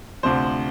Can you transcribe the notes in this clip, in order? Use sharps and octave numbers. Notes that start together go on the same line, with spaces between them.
D2 C3 F3 C5